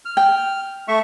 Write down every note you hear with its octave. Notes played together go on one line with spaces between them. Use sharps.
F6
G5
A3 E5 C#6